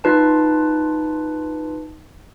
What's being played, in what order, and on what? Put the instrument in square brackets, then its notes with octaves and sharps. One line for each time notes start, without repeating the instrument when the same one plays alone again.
[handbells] D#4 F4 B4 A5